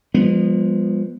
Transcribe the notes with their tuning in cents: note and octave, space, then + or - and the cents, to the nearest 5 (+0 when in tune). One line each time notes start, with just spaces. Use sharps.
F3 +0 G#3 -45 B3 -15